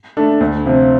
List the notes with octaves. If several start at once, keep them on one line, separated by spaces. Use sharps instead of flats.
A3 D4 A4
D2
C3 F3 C4